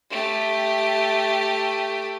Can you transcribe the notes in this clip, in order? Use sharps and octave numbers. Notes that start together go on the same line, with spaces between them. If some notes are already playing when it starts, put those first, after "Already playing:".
A3 G4